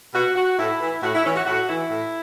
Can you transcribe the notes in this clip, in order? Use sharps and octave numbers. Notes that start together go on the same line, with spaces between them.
B2 F#4
F#4
A2 E4
E3
A2 F#4
E4
E3 C#4
F#4
A2 F#4
E3 E4
A2